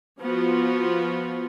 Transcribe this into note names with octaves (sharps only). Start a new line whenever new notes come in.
F3 B3 F4 F#4